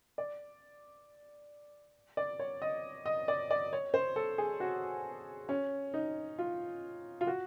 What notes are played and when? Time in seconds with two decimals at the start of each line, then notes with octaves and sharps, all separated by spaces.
0.18 D5
2.17 D5
2.39 C#5
2.62 D#5
3.06 D#5
3.28 D5
3.51 D5
3.73 C#5
3.94 C5
4.16 A4
4.38 G#4
4.60 F#4
5.49 C#4
5.94 D#4
6.39 F4
7.21 F4
7.27 F#4